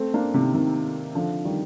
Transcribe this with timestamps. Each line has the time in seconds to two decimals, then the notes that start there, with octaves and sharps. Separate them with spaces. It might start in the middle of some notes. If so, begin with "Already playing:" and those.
Already playing: A3 C4
0.14 A#3 D4
0.34 C3 D#3
0.54 C3 D#3
1.15 D3 F3
1.45 D#3 G3